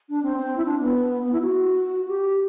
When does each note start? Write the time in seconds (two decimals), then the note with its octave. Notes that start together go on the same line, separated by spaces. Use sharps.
0.09 D4
0.23 C4
0.38 C4
0.56 E4
0.65 D4
0.80 B3
1.22 B3
1.32 E4
1.41 F#4
2.08 G4